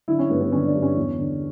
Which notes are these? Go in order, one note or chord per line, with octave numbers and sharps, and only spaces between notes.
D3 E4
C#4
G2 B3
B3
D3 C#4
D4
G2
C#4
E2
D3